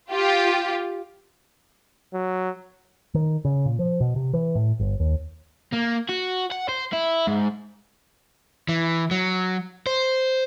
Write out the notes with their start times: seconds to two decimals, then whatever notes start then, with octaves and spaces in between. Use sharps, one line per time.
0.12 F4 G4
2.14 F#3
3.14 D#3
3.45 C#3
3.66 A#2
3.79 F3
4.00 B2
4.16 C3
4.33 E3
4.55 A2
4.80 G1
5.00 D#2
5.73 A#3
6.09 F#4
6.52 F#5
6.69 C5
6.93 E4
7.28 G#2
8.69 E3
9.11 F#3
9.86 C5